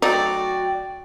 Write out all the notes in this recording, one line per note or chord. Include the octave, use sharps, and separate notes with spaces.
F#3 A3 D#4 F#4 D5 G5